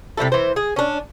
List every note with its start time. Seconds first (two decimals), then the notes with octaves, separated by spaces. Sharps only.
0.18 C3 G3 E4 A4
0.32 E3 C5
0.56 G#4
0.76 C#4 D4